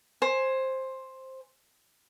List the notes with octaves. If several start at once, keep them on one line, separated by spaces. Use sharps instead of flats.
C5 G#5